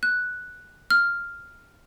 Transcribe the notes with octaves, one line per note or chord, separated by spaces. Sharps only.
F#6
F6